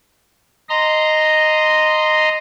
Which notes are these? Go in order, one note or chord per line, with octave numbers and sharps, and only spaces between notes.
D#5 A#5 C6